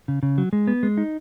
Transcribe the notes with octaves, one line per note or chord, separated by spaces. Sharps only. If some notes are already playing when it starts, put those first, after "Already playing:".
C#3
C#3
F#3
G#3
B3
G#3
D#4